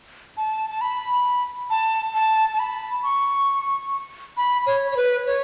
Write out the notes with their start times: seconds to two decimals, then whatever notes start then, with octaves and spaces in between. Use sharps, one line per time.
0.37 A5
0.70 A5
0.81 B5
1.70 A5
2.15 A5
2.53 A5
2.59 B5
3.03 C#6
4.37 B5
4.66 C#5
4.92 C#5
4.97 B4
5.26 C#5